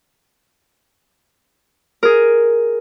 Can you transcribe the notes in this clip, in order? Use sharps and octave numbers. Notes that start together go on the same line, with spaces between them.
G#4 A#4